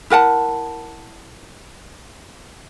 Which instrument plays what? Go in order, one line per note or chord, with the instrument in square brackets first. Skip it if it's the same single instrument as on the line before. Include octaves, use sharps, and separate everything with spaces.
[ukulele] E4 A#4 F#5 A5